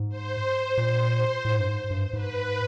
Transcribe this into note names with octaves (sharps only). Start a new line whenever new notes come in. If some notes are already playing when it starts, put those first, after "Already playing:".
Already playing: G#2
C5
A#2
A2
G2
G#2
G2
G#2 B4